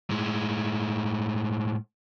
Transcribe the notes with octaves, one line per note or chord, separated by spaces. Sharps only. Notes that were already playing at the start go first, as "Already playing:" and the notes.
A2 G#3